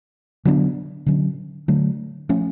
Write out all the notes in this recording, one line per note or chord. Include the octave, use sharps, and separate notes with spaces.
D3 F#3 B3 D4
D3 F#3 C#4
D3 F#3 A3
F3 A3 C#4